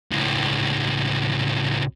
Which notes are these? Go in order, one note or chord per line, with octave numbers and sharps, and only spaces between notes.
C#2 A2